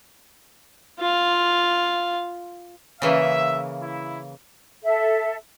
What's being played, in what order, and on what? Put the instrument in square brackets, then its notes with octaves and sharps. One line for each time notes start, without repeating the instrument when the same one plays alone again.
[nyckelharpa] F4 F5
[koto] C#3 E3 A#3 [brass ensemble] E5
[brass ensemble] E4
[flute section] A4 E5